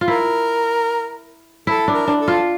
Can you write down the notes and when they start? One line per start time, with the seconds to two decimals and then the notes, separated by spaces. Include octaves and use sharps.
0.01 F4
0.08 E4 A#4
1.67 E4 A4
1.88 D4
1.94 A#4
2.08 D4
2.21 A4
2.28 F4